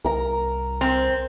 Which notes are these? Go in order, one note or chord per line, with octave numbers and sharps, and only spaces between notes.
C2 A#4 A#5
C4